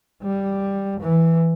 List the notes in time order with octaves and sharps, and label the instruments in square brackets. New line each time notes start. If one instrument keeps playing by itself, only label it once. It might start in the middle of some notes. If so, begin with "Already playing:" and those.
[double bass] G3
E3